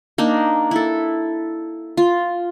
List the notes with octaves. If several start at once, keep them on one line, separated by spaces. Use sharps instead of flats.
A#3 D4 D#4
E4 A4
F4